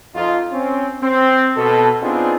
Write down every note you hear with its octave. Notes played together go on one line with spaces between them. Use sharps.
F2 D#4 F4
C4 C#4
C4
B2 A4
B3 C4 D4 D#4 F4 G#4